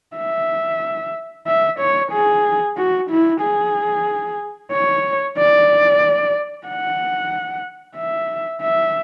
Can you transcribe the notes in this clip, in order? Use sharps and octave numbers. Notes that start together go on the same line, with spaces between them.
E5
E5
C#5
G#4
F#4
E4
G#4
C#5
D5
F#5
E5
E5